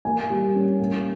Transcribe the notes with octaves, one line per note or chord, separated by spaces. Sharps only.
A#3 G#5
G3
C#4
A#3